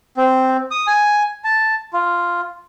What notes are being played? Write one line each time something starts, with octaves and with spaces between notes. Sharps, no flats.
C4
D#6
G#5
A5
F4